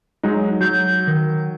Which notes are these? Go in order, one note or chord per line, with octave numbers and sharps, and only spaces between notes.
F#3 G#3 D#4
F#3 G6
D#3